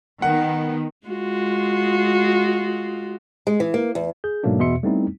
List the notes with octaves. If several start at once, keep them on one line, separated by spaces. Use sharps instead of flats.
D#3 B3 F#5
G#3 F4 F#4
G#3
E3
A#3
E2
G#4 G6
G#2 B2 F#3 A3 A#3 D4
E2 B2 E5 C6 C#7
G3 A3 B3 C4 D#4 E4